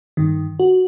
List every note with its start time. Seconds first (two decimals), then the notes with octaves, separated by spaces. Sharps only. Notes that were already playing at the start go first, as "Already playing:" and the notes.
0.17 G2 D#3
0.60 F#4